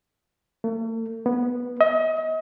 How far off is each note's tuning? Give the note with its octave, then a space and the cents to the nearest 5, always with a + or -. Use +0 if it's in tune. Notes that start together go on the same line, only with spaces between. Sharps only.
A3 +45
B3 -10
D#5 +35